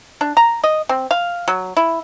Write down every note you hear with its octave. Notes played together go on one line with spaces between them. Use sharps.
D4
A#5
D#5
C4
F5
F#3
E4